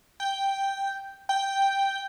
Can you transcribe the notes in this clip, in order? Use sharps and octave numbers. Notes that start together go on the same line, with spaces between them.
G5
G5